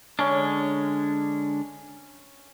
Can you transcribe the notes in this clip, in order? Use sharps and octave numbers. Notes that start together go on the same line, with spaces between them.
D3 G#3 C#4 D4 A#5